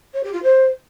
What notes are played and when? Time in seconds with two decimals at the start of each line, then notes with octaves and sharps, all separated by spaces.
0.14 C#5
0.23 G4
0.33 F4
0.43 C5